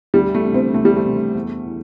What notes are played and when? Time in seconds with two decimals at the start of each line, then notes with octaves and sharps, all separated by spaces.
0.14 D2 G3
0.35 A3
0.45 C3 E3
0.54 C4
0.74 D2 A3
0.85 G3
0.97 A3
1.05 C3 E3
1.35 E2
1.66 E3